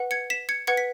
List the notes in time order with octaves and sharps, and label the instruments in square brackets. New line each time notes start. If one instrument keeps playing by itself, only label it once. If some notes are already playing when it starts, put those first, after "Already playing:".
Already playing: [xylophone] B4 F#5
G#6 C#7
B6 E7
G#6 C#7
B4 F#5 G#6 C#7
B6